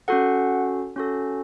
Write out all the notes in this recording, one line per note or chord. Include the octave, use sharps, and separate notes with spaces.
C#4 F#4 A4 F#5
C#4 F#4 A4